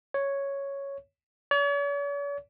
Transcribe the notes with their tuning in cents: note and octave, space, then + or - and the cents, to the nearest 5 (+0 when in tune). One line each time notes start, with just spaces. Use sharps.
C#5 +0
C#5 +45